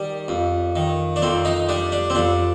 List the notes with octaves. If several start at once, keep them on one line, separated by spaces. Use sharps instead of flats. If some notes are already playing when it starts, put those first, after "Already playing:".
Already playing: D#3 G3
F2
D#3
D4
F2 C4
D#4
G3 D4
D4
C4
F2 D4